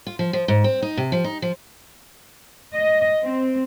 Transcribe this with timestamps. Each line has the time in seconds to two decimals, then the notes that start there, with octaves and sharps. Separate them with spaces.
0.07 F4
0.19 F3
0.33 F3
0.48 G#2
0.64 C4
0.82 D#4
0.97 C3
1.12 F3
1.24 D#4
1.42 F3
2.73 D#5
3.23 C4